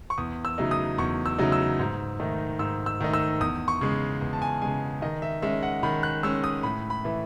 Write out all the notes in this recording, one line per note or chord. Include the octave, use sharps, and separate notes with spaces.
C#6
E2 D#6
E6
C#3 F#3 A3 D#4
D#6
E2 C#6
E6
C#3 F#3 A3 D#4
E6
G#2
D#3 A3 D#4
G#2 E6
E6
D#3 A3 D#4
E6
E2 D#6
C#6
C#3 G#3
E2
A5
G#5
C#3 G#3 G#5
D#3 D#5
E5
G#3 C#4 E5
F#5
D#3 B5
F#6
G#3 C#4 E6
D#6
A2 B5
B5
E3 A3